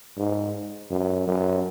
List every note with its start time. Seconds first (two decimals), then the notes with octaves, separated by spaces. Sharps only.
0.18 G#2
0.91 F#2
1.27 F#2